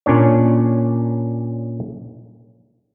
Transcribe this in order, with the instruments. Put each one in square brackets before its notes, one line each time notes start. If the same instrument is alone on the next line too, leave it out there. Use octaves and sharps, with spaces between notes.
[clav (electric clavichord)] A#2 C#4 D4 C#5